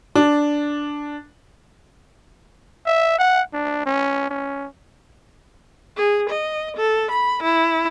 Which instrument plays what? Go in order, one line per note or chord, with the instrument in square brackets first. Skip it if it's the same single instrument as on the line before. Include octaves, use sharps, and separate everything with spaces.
[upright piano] D4
[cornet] E5
F#5
D4
C#4
C#4
[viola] G#4
D#5
A4
B5
E4